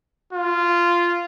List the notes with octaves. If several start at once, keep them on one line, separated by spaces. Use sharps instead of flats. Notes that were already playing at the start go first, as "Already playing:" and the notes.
F4